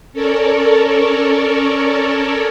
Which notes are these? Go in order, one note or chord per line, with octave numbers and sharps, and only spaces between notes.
C#4 A4 A#4 C#5 D5